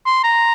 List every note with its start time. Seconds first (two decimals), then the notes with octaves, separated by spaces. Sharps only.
0.06 C6
0.24 A#5